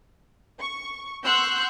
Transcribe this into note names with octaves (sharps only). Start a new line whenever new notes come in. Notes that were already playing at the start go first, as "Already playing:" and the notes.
C#6
F#5 C6 C#6 E6 F#6 G6